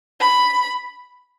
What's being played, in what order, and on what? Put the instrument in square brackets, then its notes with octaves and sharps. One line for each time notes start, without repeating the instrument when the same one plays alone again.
[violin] B5